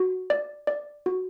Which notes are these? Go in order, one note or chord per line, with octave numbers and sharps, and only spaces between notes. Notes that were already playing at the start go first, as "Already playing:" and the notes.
Already playing: F#4
D5
D5
F#4